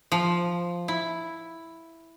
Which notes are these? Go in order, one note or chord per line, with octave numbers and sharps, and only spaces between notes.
F3
E4